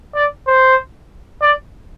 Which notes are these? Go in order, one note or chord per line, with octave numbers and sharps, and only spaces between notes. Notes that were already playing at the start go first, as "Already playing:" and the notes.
D5
C5
D5